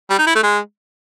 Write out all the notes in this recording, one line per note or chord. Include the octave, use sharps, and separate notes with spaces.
G3
D#4
E4
A3
G#3